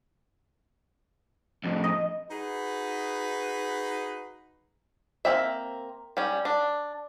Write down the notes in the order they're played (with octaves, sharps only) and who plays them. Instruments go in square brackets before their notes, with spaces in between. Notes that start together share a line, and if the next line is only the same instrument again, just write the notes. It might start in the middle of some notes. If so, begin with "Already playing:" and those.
[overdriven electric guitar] F2 A2
[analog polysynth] D#5
[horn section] D#4 F#4 G#4 B4
[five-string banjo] A#3 C4 E5
G3 C#4
D4